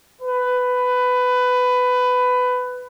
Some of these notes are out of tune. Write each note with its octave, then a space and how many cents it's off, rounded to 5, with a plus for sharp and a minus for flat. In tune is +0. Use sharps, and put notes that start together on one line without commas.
B4 +15